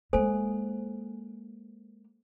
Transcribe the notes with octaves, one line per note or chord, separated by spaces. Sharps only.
G#3 A#3 A4 C5 G#5